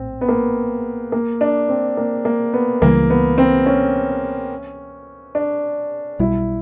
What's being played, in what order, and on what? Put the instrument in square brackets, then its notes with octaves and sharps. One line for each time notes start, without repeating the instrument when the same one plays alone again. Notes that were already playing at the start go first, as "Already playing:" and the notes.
Already playing: [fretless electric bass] A#1 A2 [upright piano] C4
[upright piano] B3
A#3
A#3
D4
C4
A#3
A#3
B3
[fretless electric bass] C#2 C#3 E3 G3 [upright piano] A#3
[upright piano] B3
C4
C#4
D4
[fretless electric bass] B1 B2 G3 [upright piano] E4